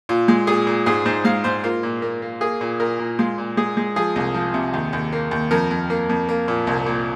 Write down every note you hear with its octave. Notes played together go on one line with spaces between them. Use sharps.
A#2 F4
G#3
A#2 G#4
A#2
G#2 G#4
G#2 C5
G#3 F5
G#2 C5
A#3 F4
A#2
A#3
A#3
A#3 G#4
A#2
A#2 A#4
A#2
G#3 F4
A#2
G#3 G#4
G#3
F3 G#4
C2
F3
C3
D#2
D#2
A#3
D#2
F2 A#4
F2
A#3
F2
A#3
A#2
C2
A#2